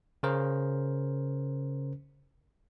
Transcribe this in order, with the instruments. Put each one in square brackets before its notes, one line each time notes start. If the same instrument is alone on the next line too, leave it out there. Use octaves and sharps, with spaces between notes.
[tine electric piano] C#3 C#4 A#4 C5